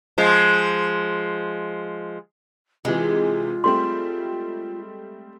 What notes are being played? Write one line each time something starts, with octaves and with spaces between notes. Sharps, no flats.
F3 G#3
C3 E3 G#3 F4
G3 A3 C4 C6